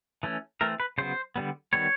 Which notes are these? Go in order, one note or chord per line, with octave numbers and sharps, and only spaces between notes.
E3 A3 C#4
E3 A3 C4 A#4
B4
C#3 F#3 B3 C5
D3 G3 B3
D#3 G3 B3 C#5